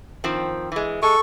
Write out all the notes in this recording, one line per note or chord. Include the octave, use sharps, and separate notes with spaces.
D#3 F3 C4
E3 G#3
G#3 A4 C#6